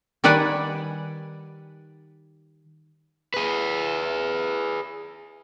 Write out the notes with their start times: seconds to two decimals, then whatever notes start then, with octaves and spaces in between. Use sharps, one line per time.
0.24 D#3 G3 B4 D5 F#5 G#5
3.34 G#4 B4